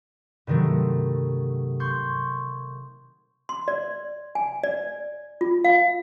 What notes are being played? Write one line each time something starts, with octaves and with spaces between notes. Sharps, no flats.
G2 C3 D#3 F#3 A3
C6 C#6 G6 G#6
C6
D5
G#5
D5
F4
F5